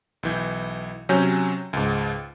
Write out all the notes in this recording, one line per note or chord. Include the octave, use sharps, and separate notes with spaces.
B1 E3 G6
C3 F#3 C#4 G#5 G6
C#2 G#2